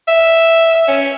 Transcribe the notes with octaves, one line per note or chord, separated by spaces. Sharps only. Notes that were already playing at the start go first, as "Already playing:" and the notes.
E5
C#4